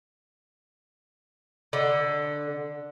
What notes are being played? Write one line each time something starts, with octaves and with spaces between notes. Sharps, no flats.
D3